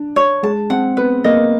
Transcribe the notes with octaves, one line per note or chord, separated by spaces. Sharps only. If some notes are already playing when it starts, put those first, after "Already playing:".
Already playing: D4
C#5
G#3 A5
C4 F#5
B3 B4
A#3 D#5